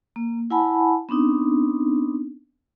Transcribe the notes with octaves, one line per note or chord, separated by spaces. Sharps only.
A#3
E4 F#5 G#5 A5 B5
B3 C4 D4 D#4